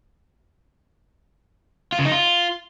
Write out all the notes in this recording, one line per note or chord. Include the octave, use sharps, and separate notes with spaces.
F4
C#3
D#4
F4